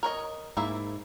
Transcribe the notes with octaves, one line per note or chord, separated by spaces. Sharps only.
A#4 C#5 D#5
G#2 A#3 E4 E5